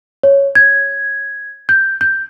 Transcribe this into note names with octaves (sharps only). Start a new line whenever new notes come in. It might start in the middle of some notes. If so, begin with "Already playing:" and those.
C#5
G#6
G6
G6